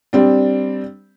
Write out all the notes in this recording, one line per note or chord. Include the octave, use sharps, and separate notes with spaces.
G3 C4 D4